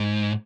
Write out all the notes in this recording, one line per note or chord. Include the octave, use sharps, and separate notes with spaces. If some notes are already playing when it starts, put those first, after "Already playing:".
Already playing: G#2